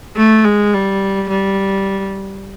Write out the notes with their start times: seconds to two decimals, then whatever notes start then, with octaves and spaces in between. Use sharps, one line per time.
0.16 A3
0.44 G#3
0.74 G3
1.29 G3